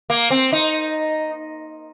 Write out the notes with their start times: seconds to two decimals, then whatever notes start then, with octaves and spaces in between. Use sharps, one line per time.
0.10 A#3
0.31 C4
0.52 D#4